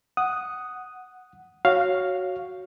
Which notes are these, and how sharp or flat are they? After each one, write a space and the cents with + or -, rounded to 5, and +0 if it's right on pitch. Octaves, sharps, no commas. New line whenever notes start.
F#5 +0 D#6 +0
F#4 +0 C#5 +0 F5 +0